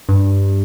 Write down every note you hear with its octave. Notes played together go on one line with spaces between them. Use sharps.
G2